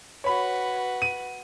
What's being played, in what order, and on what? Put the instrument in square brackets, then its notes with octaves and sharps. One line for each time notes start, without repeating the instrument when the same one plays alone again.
[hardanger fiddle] F#4 B4 [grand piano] C#5 B5
[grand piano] D#7